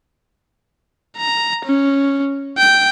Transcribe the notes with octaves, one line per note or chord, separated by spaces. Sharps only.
A#5
C#4
G5